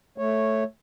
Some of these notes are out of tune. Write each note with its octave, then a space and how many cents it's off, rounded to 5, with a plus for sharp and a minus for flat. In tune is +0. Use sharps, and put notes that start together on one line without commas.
A3 +0 C#5 -10